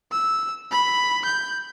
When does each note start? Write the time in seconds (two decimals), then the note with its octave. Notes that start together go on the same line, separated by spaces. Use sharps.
0.12 E6
0.72 B5
1.25 G6